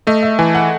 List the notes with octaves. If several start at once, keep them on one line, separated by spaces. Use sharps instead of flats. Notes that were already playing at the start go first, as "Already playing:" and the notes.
A3 D#5
E5
E3 G#5
F#5